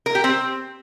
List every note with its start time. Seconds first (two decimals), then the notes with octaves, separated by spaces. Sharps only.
0.06 A#4
0.15 G4
0.24 C4